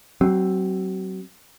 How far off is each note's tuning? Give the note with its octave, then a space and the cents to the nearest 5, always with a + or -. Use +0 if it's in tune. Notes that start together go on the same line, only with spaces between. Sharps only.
F#3 +30 C4 +10